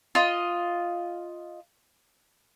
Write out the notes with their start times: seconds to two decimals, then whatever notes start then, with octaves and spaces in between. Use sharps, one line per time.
0.15 F4 D#5